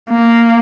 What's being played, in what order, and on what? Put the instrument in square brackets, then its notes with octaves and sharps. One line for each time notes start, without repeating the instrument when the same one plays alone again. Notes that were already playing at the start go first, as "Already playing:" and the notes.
[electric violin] A#3